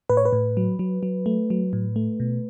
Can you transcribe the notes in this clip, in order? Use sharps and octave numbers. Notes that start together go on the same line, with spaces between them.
A2 B4
C#5
B4
A2
F#3
F#3
F#3
A3
F#3
A2
A3
B2